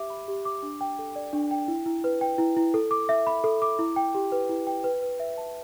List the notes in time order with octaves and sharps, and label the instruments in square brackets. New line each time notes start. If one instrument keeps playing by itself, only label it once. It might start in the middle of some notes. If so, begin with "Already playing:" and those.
Already playing: [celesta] G4 E5 D6
B5
G4
D6
D4
G5
A4
D5
D4
G5
E4
E4
B4
G5
E4
E4
A4
D6
E5
B5
A4
D6
E4
G5
G4
B4
E4
G5
B4
B4
E5
A5